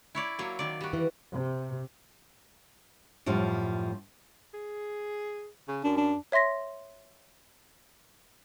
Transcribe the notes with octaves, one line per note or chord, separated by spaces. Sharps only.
E4 C#5 D5
F#3 A#3
D#3 D5
G3 F#4
E3
C3
F#2 A2 F3 G3
G#4
C#3
F#2 D4
D4
C#5 E5 C6 A#6 B6